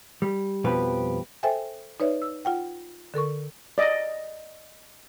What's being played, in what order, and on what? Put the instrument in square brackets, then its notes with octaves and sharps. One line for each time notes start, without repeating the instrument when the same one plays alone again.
[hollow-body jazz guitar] G3
F2 B2 F3 G3 G4 B4
[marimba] A4 C5 E5 G5 G#5
D#4 B4 C#5 D5 E5
E6
F4 F#5 G5
D3 A4 A#4 C#6
[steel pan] D5 D#5